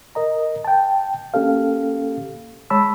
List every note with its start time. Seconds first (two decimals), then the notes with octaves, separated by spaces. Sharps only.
0.15 A#4 D#5 A#5
0.65 G5 A5
1.34 A#3 C#4 G4 A4 F5
2.70 G#3 C#5 A5 B5 E6